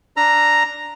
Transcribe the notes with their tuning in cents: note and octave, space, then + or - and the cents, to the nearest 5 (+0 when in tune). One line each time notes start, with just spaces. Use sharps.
D4 +0 A#5 +0 E6 +30